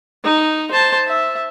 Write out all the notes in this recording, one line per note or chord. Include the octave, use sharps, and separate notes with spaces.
D#4
C5 A5
E5